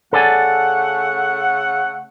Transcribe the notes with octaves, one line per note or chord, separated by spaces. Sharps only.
C#3 A3 A4 D5 F#5 G#5